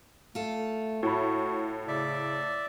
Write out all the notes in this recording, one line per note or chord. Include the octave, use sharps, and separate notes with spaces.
A3 F4 A4
A2 F#4 B5
C#3 D5 E5